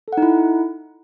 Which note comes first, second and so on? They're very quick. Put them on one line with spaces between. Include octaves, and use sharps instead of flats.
A4 F#5 D#4 E4